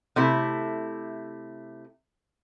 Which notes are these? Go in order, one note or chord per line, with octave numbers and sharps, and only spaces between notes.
C3 A3 E4